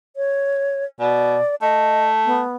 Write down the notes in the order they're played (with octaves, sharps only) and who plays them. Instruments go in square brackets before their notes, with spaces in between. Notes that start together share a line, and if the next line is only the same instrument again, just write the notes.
[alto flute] C#5
[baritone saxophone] B2 [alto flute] D5
[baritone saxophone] A3 [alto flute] D#5
[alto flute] B3